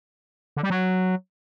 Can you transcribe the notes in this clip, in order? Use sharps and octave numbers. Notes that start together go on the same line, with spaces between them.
D3
G3
F#3